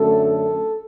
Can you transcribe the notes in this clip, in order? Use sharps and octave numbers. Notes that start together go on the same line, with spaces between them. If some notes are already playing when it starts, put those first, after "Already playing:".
Already playing: F#2 D3 A3 A4
A4